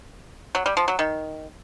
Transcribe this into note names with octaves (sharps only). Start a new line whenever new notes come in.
F#3
G3
F3
F#3
D#3